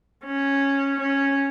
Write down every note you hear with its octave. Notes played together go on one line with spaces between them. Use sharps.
C#4
C#4